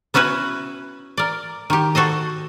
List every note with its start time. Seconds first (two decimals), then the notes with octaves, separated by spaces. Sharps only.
0.14 B3 C#4 E4 F#4 B4
1.17 A#4 D5
1.70 D#3 G4
1.95 F#4 A4 C5 D#5